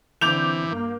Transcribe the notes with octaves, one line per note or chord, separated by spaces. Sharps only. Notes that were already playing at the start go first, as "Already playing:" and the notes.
D3 E3 C4 D6 G6 F7
G2 A#3